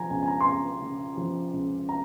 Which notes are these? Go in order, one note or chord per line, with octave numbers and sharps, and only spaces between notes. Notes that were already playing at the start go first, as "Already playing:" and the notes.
Already playing: F3 G#5 A#5
C#2 G#5
G#5
A#5
C6
C#2 A#5
C#3
F3
C#2
A#5